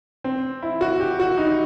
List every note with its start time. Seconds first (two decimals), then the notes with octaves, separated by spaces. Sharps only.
0.24 C4
0.63 E4
0.81 F#4
1.00 G4
1.20 F#4
1.38 D#4